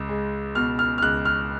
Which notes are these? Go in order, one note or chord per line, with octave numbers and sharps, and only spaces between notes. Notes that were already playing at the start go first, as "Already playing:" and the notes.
Already playing: C#2
G#3
B2 F6
F6
F6
C#2 F#6
F6